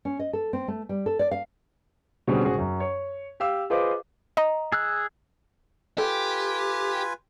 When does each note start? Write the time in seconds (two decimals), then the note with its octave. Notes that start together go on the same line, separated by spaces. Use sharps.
0.05 C#4
0.19 D#5
0.33 A4
0.53 C4
0.68 A3
0.89 G3
1.06 A4
1.19 D5
1.31 F5
2.27 B2 D3 G3 C4 C#4 G#4
2.45 G#1 C#3 F#4 G#4 C5
2.58 F#2
2.80 C#5
3.40 G4 F5 E6
3.70 F4 G#4 B4 C5 D#5 D6
4.37 D#5 A#5
4.72 G#4 E6 F#6
5.98 F4 G4 A4 B4 G#5